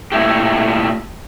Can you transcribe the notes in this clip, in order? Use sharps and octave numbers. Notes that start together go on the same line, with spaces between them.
A#2 A3 E4 G4